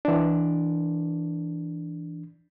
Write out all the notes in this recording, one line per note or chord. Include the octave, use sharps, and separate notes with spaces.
E3 D4